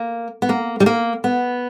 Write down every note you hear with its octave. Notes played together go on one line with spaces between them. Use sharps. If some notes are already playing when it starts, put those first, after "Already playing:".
Already playing: A#3
B3
A#3
G3
A#3
B3